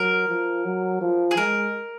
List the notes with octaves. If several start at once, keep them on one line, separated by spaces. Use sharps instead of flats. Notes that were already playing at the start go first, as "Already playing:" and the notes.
Already playing: F#3 A#4
F3
F#3
F3
G#4
G#3 A#4